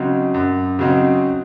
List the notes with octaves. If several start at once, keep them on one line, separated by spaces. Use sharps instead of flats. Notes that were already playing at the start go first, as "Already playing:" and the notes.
Already playing: C#3 F#3 C4 D#4
F#2
C#3 F#3 C4 D#4